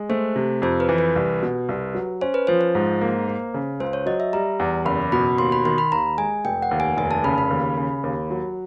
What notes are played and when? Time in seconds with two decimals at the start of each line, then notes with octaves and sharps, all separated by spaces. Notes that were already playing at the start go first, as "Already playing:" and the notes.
Already playing: G#3
0.09 A3 C5
0.36 C3
0.62 F2 C5
0.80 B4
0.89 E3
0.98 B4
1.16 C2
1.42 B2
1.69 C2
1.95 F#3
2.21 C#4 C5
2.34 B4
2.47 F3 C5
2.61 C5
2.75 G#2
3.01 A#3
3.28 A#3
3.54 C#3
3.80 C#2 C5
3.93 C#5
4.06 F#3 D#5
4.20 E5
4.33 G3 A#5
4.60 E2
4.85 F#1 B5
5.12 B2 B5
5.38 D#2 C6
5.52 B5
5.65 D#3 C6
5.78 B5
5.92 D#2 A#5
6.18 G#3 G#5
6.45 F1 G5
6.62 F#5
6.71 D#2
6.80 G#5
6.97 F1 G#5
7.11 A5
7.24 C#3 B5
7.38 B5
7.50 D#2
7.77 C#3
8.04 D#2
8.30 F#3